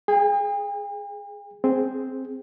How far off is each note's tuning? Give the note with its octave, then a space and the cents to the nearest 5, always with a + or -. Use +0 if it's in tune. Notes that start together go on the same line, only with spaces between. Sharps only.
G#4 +0 G5 +45
C4 +0 G#4 +0